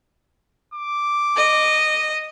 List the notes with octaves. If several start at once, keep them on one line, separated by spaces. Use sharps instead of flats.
D6
D#5